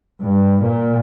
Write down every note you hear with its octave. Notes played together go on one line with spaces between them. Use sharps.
G2
A#2